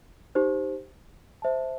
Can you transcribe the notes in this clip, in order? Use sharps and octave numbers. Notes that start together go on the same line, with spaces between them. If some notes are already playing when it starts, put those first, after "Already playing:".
D#4 G4 C5
C5 E5 A5